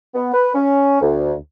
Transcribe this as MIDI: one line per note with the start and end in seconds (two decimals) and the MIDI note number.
0.15 0.32 59
0.34 0.50 71
0.54 1.00 61
1.02 1.34 38